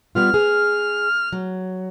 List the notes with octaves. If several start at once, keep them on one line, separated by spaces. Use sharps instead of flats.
G3 B3 F4 F6
G#4
F#3